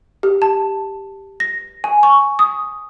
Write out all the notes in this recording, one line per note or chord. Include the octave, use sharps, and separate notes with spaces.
G4
A5
A#6
G#5
C#6
D#6